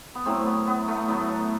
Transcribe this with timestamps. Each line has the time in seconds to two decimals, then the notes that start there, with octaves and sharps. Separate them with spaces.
0.15 B3
0.26 A2 F#3 A3 C4
0.46 B3
0.67 B3
0.88 A3
1.08 A2 F#3 B3
1.29 F#4 A4